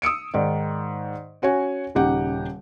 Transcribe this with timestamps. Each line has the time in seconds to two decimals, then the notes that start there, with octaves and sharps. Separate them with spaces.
0.02 D#6 E6 C#7 D7
0.34 G#2 D#3 D5
1.42 C#4 F#4 C#5 G#5
1.95 D#1 C#3 D#4 G4 F#5